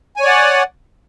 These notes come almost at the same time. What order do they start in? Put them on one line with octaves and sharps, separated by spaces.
G#5 C#5 D5 F#5